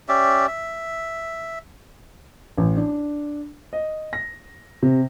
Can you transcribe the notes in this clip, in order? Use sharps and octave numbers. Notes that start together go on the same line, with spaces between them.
C#4 G4 D5 E5
E5
A1
D4
D#5
A#6
C3